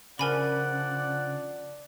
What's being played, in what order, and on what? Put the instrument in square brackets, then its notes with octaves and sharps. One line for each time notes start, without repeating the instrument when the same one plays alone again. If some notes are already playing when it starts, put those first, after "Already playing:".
[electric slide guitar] C#3 [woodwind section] F3 D4 D5 [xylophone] A#4 G#5 B5 [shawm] F#5